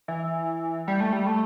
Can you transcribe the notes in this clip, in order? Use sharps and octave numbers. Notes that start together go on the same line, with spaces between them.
E3
G3
A3
G3
A3